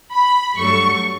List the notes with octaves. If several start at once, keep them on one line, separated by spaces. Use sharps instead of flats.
B5
G2 F#3 A3 C#6